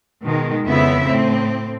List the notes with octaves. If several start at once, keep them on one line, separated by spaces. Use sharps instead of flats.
B2 D#3 G#3
F2 C#3 B3 E4 E5
A2 C4